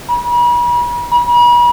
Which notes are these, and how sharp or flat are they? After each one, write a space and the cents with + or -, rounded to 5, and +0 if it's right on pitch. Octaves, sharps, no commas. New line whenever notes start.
B5 -45
B5 -45